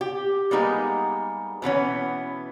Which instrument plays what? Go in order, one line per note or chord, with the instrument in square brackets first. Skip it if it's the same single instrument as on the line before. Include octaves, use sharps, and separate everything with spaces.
[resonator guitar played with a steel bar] G4
G3 G#3 A#3 B3 D#4 G#4
B2 E3 B3 C#4